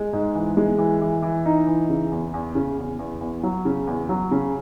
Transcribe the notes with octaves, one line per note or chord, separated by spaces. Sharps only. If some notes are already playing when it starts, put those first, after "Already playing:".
Already playing: G#3
G#2
E3
G#3
E3
E3
E3
D#4
E3
C#3
E2
E2
C#3
E2
E2
E2
F#3
C#3
E2
F#3
C#3